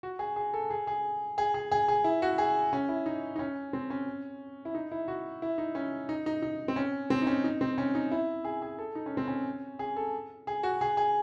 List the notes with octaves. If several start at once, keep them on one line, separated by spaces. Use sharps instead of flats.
F#4
G#4
G#4
A4
G#4
G#4
G#4
G#4
G#4
G#4
E4
F#4
G#4
C#4
E4
D#4
D#4
C#4
C4
C#4
E4
D#4
E4
F#4
E4
D#4
C#4
D#4
D#4
D#4
C4
C#4
C4
D#4
C#4
D#4
C4
C#4
D#4
E4
G#4
G#4
A4
D#4
C#4
C4
C#4
G#4
A4
G#4
F#4
G#4
G#4